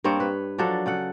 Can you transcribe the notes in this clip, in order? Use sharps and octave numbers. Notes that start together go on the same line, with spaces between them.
G2 A#3 C4 C#5
B4
F3 F#3 D4 A4
C#3 A4 F#5